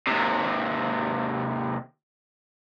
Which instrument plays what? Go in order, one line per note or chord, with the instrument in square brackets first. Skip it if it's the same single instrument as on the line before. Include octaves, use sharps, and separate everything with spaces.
[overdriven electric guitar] D#2 C3